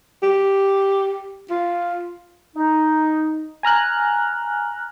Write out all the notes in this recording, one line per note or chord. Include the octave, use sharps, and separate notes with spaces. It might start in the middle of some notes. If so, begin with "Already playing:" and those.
G4
F4
D#4
G#5 A#5 F6 F#6